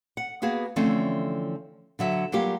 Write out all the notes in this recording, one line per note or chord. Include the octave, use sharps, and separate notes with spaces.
F#5
A#3 B3 F#4 G#4
D3 E3 F3 A3 C4 C#4
D3 F#3 E5
F#3 G3 A#3 F4 G4